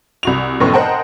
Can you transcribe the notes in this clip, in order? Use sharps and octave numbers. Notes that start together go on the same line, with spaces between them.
C2 F#4 F7
F1 F#2 A2 B3 B4 C#6
A#4 C5 D#5 F#5 G5 A5